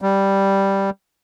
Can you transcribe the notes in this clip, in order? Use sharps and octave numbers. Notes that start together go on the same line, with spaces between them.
G3